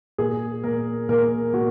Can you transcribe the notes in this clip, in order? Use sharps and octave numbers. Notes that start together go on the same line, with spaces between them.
A#2 G#4
A#2 A#4
A#2 A#4
A#2 F#4